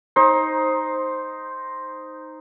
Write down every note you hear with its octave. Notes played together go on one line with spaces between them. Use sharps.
D#4 C5